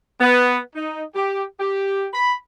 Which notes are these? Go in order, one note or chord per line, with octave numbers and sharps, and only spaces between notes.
B3
D#4
G4
G4
B5